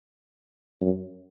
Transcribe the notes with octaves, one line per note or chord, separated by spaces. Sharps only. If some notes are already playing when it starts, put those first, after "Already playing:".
F#2